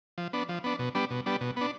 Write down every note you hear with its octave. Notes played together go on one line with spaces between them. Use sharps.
F3
B3 D4
F3
B3 D4
B2
G3 B3 D4
B2
G3 B3 D4
B2
B3 D4